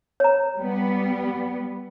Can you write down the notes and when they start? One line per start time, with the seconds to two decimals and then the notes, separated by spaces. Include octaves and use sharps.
0.20 C#5 A#5
0.56 G3 B3